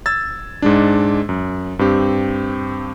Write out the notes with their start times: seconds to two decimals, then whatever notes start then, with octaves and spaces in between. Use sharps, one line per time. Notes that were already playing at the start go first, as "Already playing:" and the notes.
0.06 E6 G#6 A6
0.62 G#2 G#3 D4
1.29 F#2
1.79 G2 C4 G4